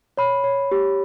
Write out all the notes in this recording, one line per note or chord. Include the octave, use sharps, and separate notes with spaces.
C#5 B5
C#5
G4